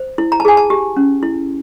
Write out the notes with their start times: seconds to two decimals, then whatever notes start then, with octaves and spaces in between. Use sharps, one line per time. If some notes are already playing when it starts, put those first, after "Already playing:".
Already playing: C5
0.18 E4
0.32 A#5
0.40 A5
0.45 G#4 G#5
0.57 A5
0.70 G4
0.97 C#4
1.23 E4